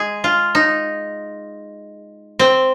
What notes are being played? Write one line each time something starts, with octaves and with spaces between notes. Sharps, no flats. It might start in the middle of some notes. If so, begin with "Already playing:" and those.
Already playing: G#3 G#4
F4
D#4
C4